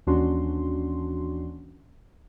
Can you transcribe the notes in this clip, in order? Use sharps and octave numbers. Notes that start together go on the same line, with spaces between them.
D#2 E3 C#4 D4 F#4 C6